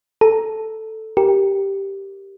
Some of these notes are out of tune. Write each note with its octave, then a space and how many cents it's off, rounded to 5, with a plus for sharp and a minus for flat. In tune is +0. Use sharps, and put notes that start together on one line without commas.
A4 +0 A#5 +0
G4 +0 A#4 +0